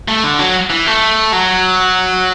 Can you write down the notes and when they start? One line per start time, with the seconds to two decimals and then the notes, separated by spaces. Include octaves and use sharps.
0.08 A3
0.24 D3
0.39 F#3
0.70 E3
0.87 A3
1.33 F#3